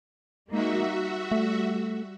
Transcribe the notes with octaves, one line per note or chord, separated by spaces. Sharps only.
G#3 A#3 D#4 F#4 E5
G3
A3